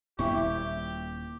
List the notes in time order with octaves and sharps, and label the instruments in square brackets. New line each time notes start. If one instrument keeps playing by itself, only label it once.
[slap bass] D#1 A#2 G3 [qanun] E4 [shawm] G4 [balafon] E5 G5 C#6